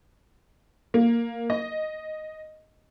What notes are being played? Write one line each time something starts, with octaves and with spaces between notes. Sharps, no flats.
A#3
D#5